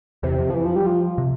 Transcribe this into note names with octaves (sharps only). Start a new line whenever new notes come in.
E2 C3
F2
F3
E3
F3
G3
F3
C3